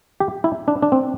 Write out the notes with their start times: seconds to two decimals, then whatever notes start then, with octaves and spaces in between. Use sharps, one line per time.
0.20 G4
0.44 E4
0.68 D4
0.82 D4
0.92 C4